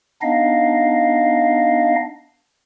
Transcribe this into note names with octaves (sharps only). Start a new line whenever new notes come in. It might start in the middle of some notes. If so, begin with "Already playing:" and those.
B3 D4 D#4 D#5 F5